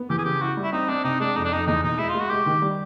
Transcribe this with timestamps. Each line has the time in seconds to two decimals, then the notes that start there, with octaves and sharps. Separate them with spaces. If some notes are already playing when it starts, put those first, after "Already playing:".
Already playing: B3
0.10 E3 G4
0.18 G#4
0.25 C#3 G4
0.42 E4 F#4
0.57 G3
0.63 E4
0.73 C4 D#4
0.89 C4 D4
1.04 C3 D#4
1.20 G#3 D4
1.36 F2 D#4
1.44 D4
1.52 F2 D#4
1.67 E2 D#4
1.83 B2 D#4
1.98 G#3 E4
2.09 F4
2.15 G#3
2.20 F#4
2.30 G#3 G4
2.46 D#3
2.62 G3